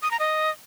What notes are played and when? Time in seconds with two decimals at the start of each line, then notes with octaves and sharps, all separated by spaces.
0.02 D#6
0.11 A#5
0.20 D#5